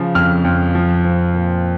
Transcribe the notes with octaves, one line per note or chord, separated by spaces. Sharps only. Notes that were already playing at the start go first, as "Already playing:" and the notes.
Already playing: C#3 F3
F2 F6
F2
F3
C4
A#2